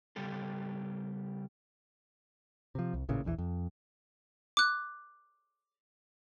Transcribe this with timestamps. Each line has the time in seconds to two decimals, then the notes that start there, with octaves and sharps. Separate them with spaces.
0.16 C#3 G3 G4 A4
2.75 C3 F3
2.94 C2
3.09 A1 A#2 C#3 E3
3.25 A#1 E2 D#3 E3
3.38 F2
4.57 D6 F#6